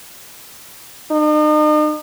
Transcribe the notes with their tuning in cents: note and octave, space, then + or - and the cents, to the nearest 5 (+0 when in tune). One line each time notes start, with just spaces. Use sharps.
D#4 -40